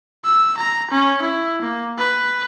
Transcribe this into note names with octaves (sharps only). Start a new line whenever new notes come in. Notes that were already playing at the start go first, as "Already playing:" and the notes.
E6
A#5
C#4
E4
A#3
B4